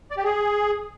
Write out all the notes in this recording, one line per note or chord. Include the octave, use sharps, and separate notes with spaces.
D5
G4
G#4